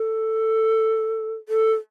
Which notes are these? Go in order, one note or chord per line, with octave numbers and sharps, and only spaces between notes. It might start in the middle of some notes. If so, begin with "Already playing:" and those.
Already playing: A4
A4